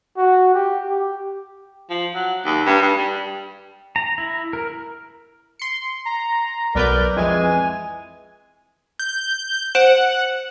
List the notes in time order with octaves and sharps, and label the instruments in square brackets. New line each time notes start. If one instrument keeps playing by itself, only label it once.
[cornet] F#4
G4
G4
[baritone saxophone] F3
F#3
D#2
G2
G2
G3
[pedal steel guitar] A#5
E4
A#4
[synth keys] C6 C#7
[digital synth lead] A#5
[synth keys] B1 B4 G6 [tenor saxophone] A#4 [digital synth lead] D5
[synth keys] F2 [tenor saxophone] E3 [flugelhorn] G#3 [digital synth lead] G#5
[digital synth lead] G6
[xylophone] C5 D7 E7 [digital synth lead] F#5